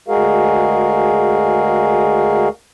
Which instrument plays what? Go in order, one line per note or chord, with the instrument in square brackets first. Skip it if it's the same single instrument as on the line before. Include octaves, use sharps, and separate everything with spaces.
[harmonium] D2 G#3 F#4 G#4 A#4 F5